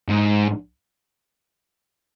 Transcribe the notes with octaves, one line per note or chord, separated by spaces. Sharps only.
G#2